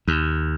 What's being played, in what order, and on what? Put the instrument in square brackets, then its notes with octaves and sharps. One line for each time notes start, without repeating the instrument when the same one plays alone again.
[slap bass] D#2